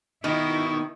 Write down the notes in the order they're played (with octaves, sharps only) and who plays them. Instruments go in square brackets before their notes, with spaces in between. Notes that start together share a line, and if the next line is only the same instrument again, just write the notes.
[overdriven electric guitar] B2 [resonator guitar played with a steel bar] D#3 [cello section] E4